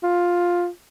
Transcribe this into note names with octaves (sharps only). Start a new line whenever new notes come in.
F4